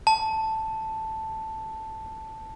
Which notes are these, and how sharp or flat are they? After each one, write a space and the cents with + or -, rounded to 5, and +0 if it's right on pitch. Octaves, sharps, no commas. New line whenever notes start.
A5 +0